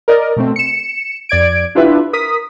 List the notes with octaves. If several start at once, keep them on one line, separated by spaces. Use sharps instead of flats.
A#4 D5 D#5
B2 A3 C4
C#7 E7
F2 D5 G#6 D7
D4 E4 F4 G4 B4 E5
A#4 D#6 B6